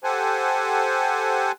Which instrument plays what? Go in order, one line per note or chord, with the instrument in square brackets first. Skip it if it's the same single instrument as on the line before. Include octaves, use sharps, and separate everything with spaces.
[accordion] G4 A4 C5 F#5 G#5